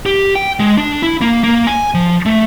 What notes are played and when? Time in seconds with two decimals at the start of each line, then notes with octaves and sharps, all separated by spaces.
0.06 G4
0.35 G5
0.60 G#3
0.77 D4
1.02 E4
1.21 A#3
1.44 A#3
1.67 G#5
1.94 F3
2.26 A3